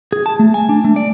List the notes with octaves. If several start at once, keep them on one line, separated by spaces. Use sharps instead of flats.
G#4
A5
A3
G#5
D4
A3
D5